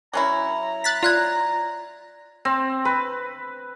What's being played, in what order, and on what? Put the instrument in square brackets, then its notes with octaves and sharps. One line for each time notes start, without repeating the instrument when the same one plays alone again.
[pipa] F#3 C#4 E4 [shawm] A#5
[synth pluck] F#6 A6 B6
[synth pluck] F4 [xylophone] D5 F#6 G#6
[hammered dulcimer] C4
B4